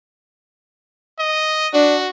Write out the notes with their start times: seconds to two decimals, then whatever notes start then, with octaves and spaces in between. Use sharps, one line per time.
1.20 D#5
1.74 D4 F#4